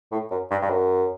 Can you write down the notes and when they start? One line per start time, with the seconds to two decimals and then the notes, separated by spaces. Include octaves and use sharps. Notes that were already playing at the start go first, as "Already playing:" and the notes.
0.12 A2
0.31 F#2
0.51 G2
0.62 G2
0.70 F#2